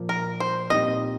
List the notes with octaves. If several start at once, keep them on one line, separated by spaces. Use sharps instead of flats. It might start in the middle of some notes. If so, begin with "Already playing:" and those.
Already playing: A#2 F3 A#3
A#4
C5
A#2 G3 C4 D#4 D#5